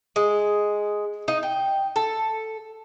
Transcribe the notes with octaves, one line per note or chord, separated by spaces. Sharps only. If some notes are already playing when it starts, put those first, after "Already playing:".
G#3
D#4
G5
A4